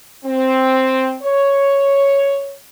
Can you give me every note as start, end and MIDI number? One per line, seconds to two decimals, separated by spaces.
0.25 1.15 60
1.23 2.54 73